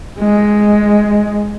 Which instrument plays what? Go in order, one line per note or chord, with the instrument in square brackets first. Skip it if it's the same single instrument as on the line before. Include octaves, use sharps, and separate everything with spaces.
[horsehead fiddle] G#3